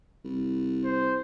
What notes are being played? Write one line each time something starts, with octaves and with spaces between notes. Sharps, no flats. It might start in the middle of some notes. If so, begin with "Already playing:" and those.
C2
C5